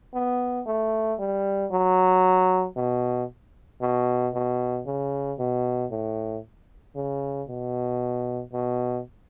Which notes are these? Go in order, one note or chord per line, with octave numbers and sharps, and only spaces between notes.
B3
A3
G3
F#3
B2
B2
B2
C#3
B2
A2
C#3
B2
B2